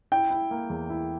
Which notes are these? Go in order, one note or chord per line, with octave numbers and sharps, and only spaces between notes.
E4 G5
E4
A#3
E2
E4